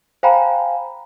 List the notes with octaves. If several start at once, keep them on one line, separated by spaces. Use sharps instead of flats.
C5 F5 G5 G#5 A#5 B5